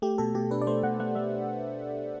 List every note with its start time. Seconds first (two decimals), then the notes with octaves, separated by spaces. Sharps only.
0.02 A3 G4
0.18 B2 A4
0.35 B2 G4
0.51 D4 B4
0.61 D5
0.67 A3 C5
0.83 B2 F#5
1.00 A3 F#5
1.15 A3 E5